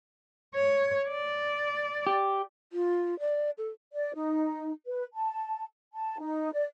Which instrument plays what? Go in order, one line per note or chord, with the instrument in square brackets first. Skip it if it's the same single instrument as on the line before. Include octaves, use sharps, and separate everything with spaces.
[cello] C#5
D5
[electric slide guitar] G4
[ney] F4
D5
A4
[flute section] D5
D#4
B4
A5
A5
D#4
D5